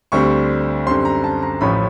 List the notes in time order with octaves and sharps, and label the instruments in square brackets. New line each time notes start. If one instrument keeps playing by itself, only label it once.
[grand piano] D2 D3 G3 C4 C#6
F#2 D3 G3 C4 C6
A#5
A5
A#5
A1 A2 F3 A3 C#4 B5